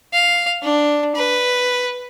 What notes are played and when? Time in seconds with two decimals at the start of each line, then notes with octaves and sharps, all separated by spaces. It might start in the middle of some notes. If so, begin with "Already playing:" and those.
0.14 F5
0.63 D4
1.15 B4